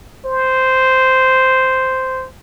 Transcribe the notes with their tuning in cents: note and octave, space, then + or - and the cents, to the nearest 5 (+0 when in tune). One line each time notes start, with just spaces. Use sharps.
C5 -5